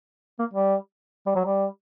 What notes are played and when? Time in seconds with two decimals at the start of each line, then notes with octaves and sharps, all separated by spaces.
0.39 A#3
0.53 G3
1.26 G3
1.35 F#3
1.45 G3